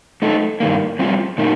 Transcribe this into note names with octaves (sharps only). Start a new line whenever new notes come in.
A3 D#4 A4
G2 D#3 A#3
G3 C4 F4
A#2 A3 D#4 A#4